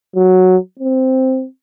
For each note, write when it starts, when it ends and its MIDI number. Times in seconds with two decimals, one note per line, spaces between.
0.16 0.56 54
0.79 1.45 60